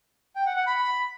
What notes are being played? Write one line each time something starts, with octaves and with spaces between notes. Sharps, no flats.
G5
F#5
F#5
B5
B5